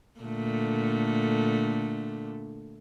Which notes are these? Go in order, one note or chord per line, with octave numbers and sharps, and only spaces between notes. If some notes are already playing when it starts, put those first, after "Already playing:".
A#2 D3 A3